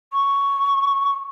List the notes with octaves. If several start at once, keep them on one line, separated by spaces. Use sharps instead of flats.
C#6